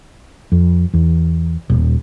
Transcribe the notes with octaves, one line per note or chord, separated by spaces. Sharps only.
F2
E2
D#1